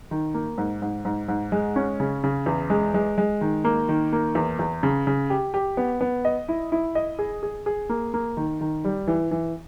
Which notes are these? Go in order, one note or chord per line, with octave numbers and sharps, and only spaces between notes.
D#3
A#3
G#2
G#2
G#2
G#2
G#3
C#4
C#3
C#3
E2
G#3
G#3
G#3
D#3
A#3
D#3
A#3
E2
E2
C#3
C#3
G4
G4
B3
B3
D#5
E4
E4
D#5
G#4
G#4
G#4
A#3
A#3
D#3
D#3
G3
E3
E3